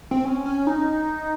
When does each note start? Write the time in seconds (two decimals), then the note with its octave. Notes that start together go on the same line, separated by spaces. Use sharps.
0.11 C4
0.25 C#4
0.46 C#4
0.67 D#4